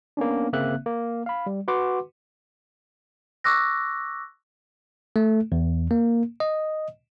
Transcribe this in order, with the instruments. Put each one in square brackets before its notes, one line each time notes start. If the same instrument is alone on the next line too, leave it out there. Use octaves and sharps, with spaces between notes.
[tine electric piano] A#3 B3 C#4 D4
G1 C#3 A#3 C4 E5 F#6
A#3
F5 B5
G3
F#4 B4 F#5 C6 D6
[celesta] C#6 D6 E6 F#6 A#6
[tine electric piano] A3
E2
A#3
D#5